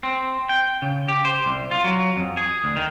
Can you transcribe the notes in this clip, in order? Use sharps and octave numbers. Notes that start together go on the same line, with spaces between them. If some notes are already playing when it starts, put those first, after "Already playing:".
C4
G5
C#3
G4
C5
C2
F4
F#3
F2
G#4
D2
D#3